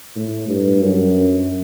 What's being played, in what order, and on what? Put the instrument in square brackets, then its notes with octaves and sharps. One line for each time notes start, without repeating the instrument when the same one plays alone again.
[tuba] A2
G2
F#2